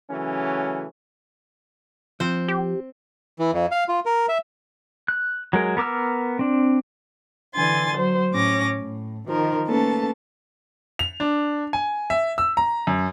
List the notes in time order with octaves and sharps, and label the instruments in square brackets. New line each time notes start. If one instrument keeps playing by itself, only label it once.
[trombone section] C#3 E3 F#3 A3 C#4
[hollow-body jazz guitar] F3 [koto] C4 C5
[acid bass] G4
[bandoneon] E3
F2
F5
F4
A#4
E5
[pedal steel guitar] F#6
F#3 G#3 A#4
B3 A#4 D6 E6 F6
C4 D4
[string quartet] D3 E3 G#5 C6 A6
F#3 C5
A2 C#4 D6 A#6
A2
D#3 F3 A#4
A3 A#3 C#4 A4 B4 A5
[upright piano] F7
D4
G#5
E5
E6
A#5
F#2